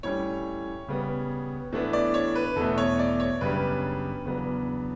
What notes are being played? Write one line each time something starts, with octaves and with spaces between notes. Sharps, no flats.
A2 G3 C#4 C#5
C#3 G3 B3
A2 E3 B3 D4
D5
C#5
B4
E2 B2 A3 A4
C#5
D5
C#5
F#2 C#3 G3 B3 D4 B4
E2 C#3 F#3 B3 D4